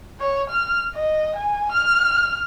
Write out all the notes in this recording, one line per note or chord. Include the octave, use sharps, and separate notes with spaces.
C#5
F6
D#5
G#5
F6